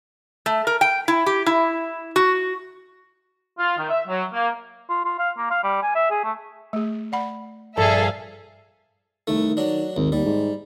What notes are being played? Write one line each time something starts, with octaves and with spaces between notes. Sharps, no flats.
A3
A#4
G5
E4
G4
E4
F#4
F4
D#3
E5
F#3
A#3
F4
F4
F5
A#3
F5
G3
G#5
E5
G#4
A3
A3 G#4
D5 F#5 B5
A#1 G2 G#4 A4 E5 F5
C2 D#3 A3
F#3 D4
G#1 D#2
D#2 G3
G#2